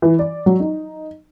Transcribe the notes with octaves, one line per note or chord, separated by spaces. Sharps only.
E3
D5
F#3
D#4